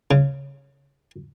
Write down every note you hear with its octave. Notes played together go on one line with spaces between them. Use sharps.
C#3